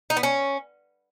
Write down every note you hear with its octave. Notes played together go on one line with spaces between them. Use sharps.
D#4
B3
C#4